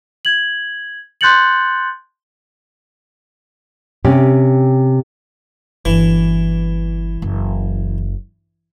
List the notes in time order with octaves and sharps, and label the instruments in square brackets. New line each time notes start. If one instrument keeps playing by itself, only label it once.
[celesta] G#6 F#7
C6 F#6 G6 A6 C#7 F#7
[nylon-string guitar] C3 C#4 G4
[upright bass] G1 [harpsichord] E3
[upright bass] F#1